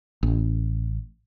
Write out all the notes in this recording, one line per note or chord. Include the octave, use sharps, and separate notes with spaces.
A1